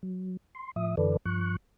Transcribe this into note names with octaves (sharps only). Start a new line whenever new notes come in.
F#3
C6
A2 F3 E5 D#6
F#2 D3 E3 A4 B4 D5
G2 F3 C#6 F#6